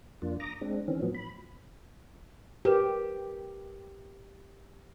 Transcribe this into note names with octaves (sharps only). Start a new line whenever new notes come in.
F2 A#3 D4 F4
A#5 D6 D#6 A#6
G#3 C4 D4
D#3 E3 C4 C#4
A2 F3 F#3 B3
B5
G4 A#4 B4 C#5